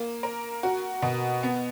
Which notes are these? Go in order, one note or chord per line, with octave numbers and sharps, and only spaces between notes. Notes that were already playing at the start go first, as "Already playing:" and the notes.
Already playing: A#3
A#4
F#4
B2
B3